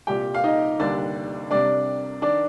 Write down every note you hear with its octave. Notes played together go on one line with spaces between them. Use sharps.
C2 A#2 G3 G4 G5
F5
D#4 D#5
F1 D#2 D3 G3 D4 D5
C2 C3 G3 D4 D5
D#3 D4 D5